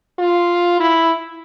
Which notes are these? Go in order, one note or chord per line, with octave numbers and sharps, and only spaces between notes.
F4
E4